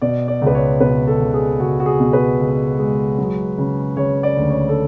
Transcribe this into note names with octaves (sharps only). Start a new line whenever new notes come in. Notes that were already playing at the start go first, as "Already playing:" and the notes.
B2 D5
D5
C#2 B4
C#5
B2 B4
A4
C#2
G#4
C#2 F#4
F#4
G#4
B2
B4
C#2
G#3
F#3
C#3
C#3 C#5
D5
D2
C#5
A4